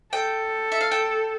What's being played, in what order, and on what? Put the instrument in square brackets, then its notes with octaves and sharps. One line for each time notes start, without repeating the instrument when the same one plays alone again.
[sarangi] A4 [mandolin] G5
[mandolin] E5
F5
G5